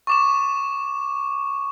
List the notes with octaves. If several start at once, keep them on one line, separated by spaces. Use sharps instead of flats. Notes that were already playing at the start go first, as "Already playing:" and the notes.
C#6 D6 E7